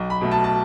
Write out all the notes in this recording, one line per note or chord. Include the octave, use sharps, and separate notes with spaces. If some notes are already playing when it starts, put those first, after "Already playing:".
Already playing: B1
B5
B2 A3
A5
A5